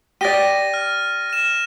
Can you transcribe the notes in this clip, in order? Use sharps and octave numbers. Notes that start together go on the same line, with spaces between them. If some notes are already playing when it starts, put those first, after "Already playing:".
G4 D5 A6 A#6 D#7
F6
F6 E7